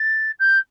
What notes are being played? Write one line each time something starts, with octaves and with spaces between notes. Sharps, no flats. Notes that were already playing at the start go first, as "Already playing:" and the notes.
Already playing: A6
G6